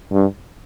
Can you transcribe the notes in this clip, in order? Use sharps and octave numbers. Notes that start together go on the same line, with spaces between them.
G2